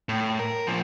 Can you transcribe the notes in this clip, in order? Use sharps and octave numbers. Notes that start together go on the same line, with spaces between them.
A2
A#4
A#2 F3